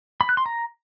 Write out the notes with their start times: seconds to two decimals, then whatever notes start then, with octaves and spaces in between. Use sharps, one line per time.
0.21 B5
0.29 F#6
0.37 C6
0.46 A#5